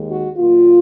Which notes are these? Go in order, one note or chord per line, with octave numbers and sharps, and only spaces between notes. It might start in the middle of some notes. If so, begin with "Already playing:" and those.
Already playing: D#2 D#3 G#3
F#4
A#2 F#3 A#3 F4